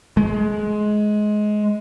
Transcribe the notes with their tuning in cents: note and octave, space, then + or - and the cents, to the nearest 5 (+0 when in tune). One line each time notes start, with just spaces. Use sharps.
G#3 +20